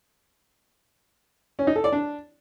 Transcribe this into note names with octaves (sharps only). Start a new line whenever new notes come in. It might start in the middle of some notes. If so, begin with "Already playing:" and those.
C#4
D#4
A4
D5
D4